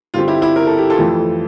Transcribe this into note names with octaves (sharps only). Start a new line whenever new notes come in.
G2 D3 G3 C4 F4
E4 G4
E4 G4
A#4
A4
G4
F4 A4
F2 E3 A3